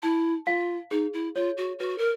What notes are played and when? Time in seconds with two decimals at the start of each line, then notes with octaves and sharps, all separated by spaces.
0.03 E4 A5
0.46 F4 F5
0.91 D#4 G#4
1.13 E4
1.35 F4 C#5
1.57 F#4
1.79 F#4 B4
1.98 A#4